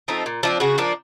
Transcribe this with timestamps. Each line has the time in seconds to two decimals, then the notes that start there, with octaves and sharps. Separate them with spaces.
0.08 F3 A3 C4 D#4
0.26 A#2
0.43 F3 A3 C4 D4
0.60 C#3 F#4
0.78 F3 A#3 D4